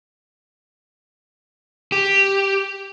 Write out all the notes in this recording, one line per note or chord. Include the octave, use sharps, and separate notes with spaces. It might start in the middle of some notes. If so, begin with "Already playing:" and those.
G4